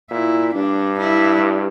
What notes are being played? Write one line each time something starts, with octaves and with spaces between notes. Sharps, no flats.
A#2 E4
G2 D4
E4